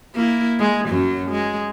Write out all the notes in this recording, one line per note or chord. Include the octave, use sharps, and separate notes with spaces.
A#3 E4
G#3
F#2 F#3
G#3